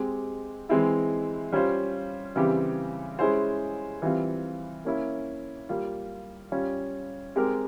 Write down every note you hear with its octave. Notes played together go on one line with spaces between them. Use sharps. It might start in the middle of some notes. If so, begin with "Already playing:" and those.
Already playing: G#3 C4 G4
E3 G#3 C4 E4
G3 C#4 F4 C5
C#3 E3 G3 C4 G4
G#3 C#4 E4 G#4 C5
E3 G3 C4 F4
A#3 C#4 E4
G3 A#3 F4
G3 C#4 F4
G#3 C4 G4 A#4